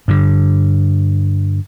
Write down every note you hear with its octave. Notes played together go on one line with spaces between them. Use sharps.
G2 D3